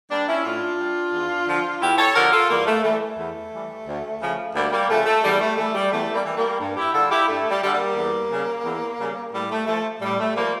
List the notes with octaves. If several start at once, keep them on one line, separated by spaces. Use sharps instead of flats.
G3 A#3 D4
C#4 E4
A2 D4 F4
G3
E2
D3 F3
E2 E4 G4
A4 C#5
D3 F3 G4 A#4
F4 A4
E2 G3 A#3
A3
E3 G3 A3
A3
E2
E3 G3
D2
C#3 F3
D2 G3 A#3
G3 A#3
C#3 F3 A3
A3
E2 G3
A3
E3 G3 A3
G3
E2 A3
G3 A#3
E3 G3
G3 A#3
G2
E4 G4
D3 G3 F4 A4
E4 G4
G2 A3
G3
D3 G3
G3 A#3
E2
C#3 G3
E2
C#3 G3
A2 G3
A3
F3 A3
A2 G3
A3
F3 G3 A#3